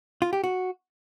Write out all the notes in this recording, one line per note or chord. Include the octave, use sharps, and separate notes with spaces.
F4
G4
F#4